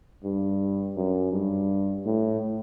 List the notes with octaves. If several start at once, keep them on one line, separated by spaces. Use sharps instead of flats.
G2
F#2
G2
A2